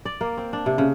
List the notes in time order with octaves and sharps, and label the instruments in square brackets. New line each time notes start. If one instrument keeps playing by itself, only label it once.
[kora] D5
A#3
C4
D4
C3
C#3